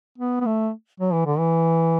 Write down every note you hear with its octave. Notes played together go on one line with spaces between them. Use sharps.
B3
B3
A3
F#3
E3
D3
E3